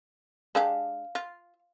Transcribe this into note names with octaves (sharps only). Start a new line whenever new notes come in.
G#3 D4 G4 F5
F4